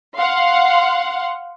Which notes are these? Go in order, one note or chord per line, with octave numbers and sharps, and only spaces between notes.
F5 F#5 C6